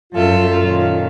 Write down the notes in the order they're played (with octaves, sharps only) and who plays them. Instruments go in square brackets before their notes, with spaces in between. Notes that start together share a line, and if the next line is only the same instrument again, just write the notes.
[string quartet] F#2 A4 E5 [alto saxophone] F4
[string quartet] A#2 D#3 C#4